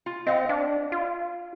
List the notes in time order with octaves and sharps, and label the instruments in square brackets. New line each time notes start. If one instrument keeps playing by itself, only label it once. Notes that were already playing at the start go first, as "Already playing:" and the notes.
[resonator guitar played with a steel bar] F4
[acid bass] C4 [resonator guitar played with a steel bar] D#5 F5 F#5
[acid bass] D4
F4